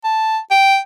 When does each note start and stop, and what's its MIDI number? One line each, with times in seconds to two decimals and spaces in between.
0.04 0.38 81
0.51 0.77 79